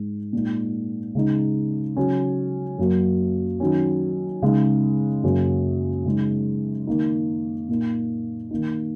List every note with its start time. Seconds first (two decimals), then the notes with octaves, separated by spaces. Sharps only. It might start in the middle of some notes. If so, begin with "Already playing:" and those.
Already playing: G#2 G#3 D#4
0.33 A#2 G#3 D#4
1.15 C#3 G#3 D#4
1.96 C#3 F#3 C#4
2.78 F#2 F#3 A#3
3.60 D#3 F#3 C#4
4.42 C#3 G#3 D#4
5.23 F#2 C#3 F#3 A#3 C#4
6.05 C#3 G#3 D#4
6.87 D#3 A#3 D#4
7.68 A#2 A#3 D#4
8.51 D#3 A#3 D#4